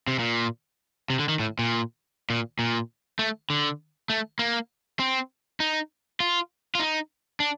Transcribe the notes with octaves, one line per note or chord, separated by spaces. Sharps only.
C3
A#2
C3
D3
D#3
A2
A#2
A#2
A#2
A3
D3
A3
A#3
C4
D#4
F4
F4
D#4
D4